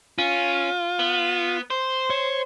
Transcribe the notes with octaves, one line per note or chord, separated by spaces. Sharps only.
C#4 F4
B3
C5
C#5